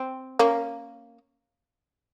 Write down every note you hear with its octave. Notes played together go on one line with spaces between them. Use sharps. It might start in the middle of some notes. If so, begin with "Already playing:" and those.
Already playing: C4
A#3 C#4